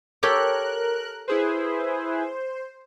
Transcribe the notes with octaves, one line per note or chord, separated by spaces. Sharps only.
G4 A4 A#4 C#5 F#6
E4 G#4 B4 C5